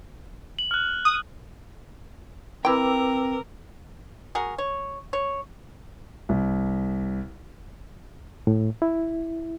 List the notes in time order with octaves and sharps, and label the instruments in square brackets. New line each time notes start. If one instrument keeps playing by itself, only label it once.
[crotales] F#7
F6 F#6
[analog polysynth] D#6
[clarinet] C4 [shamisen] E4 G5 [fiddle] A#4 [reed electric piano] B4 D6 E6
[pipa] F#4 G#4 A#4
C#5
C#5
[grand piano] C2
[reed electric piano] A2
E4